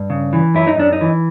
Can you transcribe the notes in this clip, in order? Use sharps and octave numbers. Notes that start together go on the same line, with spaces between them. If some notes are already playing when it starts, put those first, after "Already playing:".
Already playing: G2
C#3
E3
F#2 E4
D#4
F#2 D4
D#4
E3